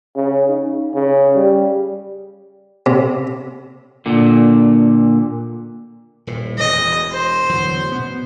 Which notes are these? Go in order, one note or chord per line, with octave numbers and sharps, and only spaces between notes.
C#3
D#4
C#3
G3
C3
A#2 D3
D#1 A2
E1 E2 D#5
C5
D1 E2 F#3
B2 B3